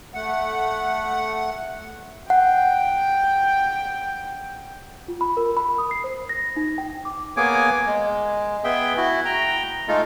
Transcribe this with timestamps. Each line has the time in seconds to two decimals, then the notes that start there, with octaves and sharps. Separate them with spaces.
0.14 A3 F#5
2.30 F#5 G5
5.08 F4
5.21 B5
5.37 A#4
5.57 B5
5.78 D#6
5.91 C7
6.04 C5
6.29 A#6
6.57 D#4
6.78 G5
7.05 D6
7.37 A#3 B3 G#4 C#5 G#5 D6
7.87 G#3
8.64 B3 G#4 E5 G5
8.97 E4 F#4
9.25 G5 A#5
9.88 G#3 A3 D#4 F4 A4